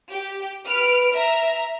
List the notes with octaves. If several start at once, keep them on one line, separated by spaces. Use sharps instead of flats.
G4
B4 F6 D7
E5 A#5